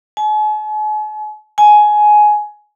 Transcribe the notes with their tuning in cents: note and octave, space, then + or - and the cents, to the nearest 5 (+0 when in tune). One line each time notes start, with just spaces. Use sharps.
G#5 +45
G#5 +15